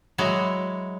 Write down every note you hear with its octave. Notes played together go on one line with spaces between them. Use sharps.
F#3 G#3 E4 F#4